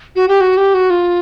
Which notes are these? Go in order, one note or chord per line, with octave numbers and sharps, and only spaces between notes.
F#4
G4
F#4
G4
F#4
F4